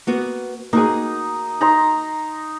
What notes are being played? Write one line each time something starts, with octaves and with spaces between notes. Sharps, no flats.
A#3 B3 F#4
A#3 D#4 F#4 G#4 D#6
D#4 A#5 C6